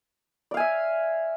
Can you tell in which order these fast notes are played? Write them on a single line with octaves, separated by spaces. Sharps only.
D5 F5 G#5 E5